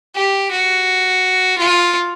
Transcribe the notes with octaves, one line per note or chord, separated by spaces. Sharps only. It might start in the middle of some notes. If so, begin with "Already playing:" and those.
G4
F#4
F4